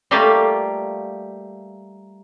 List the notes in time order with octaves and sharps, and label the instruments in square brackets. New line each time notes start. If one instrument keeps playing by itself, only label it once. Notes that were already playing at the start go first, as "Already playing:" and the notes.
[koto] G3 A3 A#3 F4 G4